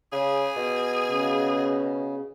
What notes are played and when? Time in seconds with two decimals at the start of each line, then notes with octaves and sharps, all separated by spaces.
0.12 C#3 G#4
0.56 B2
1.05 C#3